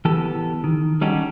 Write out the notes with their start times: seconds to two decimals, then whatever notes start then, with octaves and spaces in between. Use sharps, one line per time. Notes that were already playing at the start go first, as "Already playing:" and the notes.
0.05 E3 B3 G4 A4
0.64 D#3
1.01 G3 C#4 D#4 F#4 G4 A4